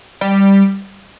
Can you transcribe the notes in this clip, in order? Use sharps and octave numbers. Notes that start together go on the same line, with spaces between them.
G3